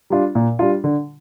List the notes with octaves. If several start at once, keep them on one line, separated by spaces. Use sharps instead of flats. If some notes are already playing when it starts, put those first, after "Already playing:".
G3 D4 F4
A#2
G3 D4 F4
D3